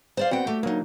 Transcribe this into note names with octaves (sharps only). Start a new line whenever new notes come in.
C5 D5 F5
B3 C4 F#4 F#5 G5
A3 F#4 G4
D2 F#3 A#3 D#4